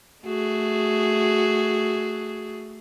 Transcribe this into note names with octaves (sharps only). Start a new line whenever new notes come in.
A3 F#4 G#4